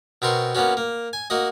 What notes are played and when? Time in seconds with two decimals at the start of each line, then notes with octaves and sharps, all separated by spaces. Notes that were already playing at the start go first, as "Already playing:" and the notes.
0.22 B2 C4 A#4 C6 C#6
0.55 A#3 B3 C#4 F#4
0.77 A#3
1.13 G#5
1.30 A#3 F#4 D#5